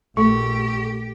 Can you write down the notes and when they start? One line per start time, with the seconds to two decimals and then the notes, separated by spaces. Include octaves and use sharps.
0.17 A#1 A3 G4 C#6